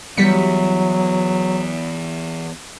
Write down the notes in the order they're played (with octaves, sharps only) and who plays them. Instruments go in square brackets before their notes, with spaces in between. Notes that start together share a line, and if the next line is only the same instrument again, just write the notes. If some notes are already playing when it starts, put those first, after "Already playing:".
[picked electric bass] E3 B3 [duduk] F#3 [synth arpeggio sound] G3 B6 C#7